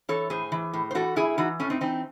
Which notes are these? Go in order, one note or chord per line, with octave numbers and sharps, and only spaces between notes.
E3 A4 C#5
A2 G#4 C5
E3
A2
C5
E3 F#4 A4
A2 E4 G#4
E3 D#4 F#4
A2 A3 C#4
C4 D#4
E3 C4 D#4